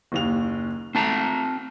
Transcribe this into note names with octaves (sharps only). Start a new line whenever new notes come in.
F#1 D#2 F7
A3 C4 A5 A#5